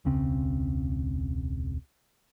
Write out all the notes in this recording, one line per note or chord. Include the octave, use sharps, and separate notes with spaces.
E1 C#2 C#3 C4